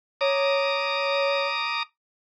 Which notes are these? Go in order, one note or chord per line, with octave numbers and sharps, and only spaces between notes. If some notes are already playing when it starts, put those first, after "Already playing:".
C#5 A#5 D6 D#6